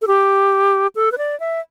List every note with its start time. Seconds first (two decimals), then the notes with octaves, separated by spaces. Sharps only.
0.02 A4
0.07 G4
0.95 A4
1.12 B4
1.18 D5
1.40 E5